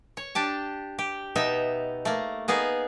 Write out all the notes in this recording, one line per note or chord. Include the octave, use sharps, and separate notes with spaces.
C#5
D4 G4 A5
G4
B2 B3 D#4 E5
A3 A#3
A#3 B3 D#4 G#4